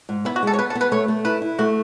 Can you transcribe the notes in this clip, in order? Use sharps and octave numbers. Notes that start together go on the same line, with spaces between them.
G#2
B3 E4
F#4
G#3 A4
C#5
B3 B4
A4
B3
B4
A3 C#5
A3
E4 B4
E4
A3 F#4